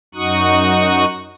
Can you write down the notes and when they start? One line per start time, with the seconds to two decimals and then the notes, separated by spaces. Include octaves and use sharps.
0.15 F#2 D#4 F#4 C#6 D#6 F#6